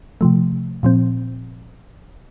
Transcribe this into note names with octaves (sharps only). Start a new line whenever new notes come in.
C3 F3 A3
A#2 F3 C4